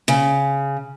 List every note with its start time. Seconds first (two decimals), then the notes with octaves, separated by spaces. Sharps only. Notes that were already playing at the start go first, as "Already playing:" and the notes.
0.08 C#3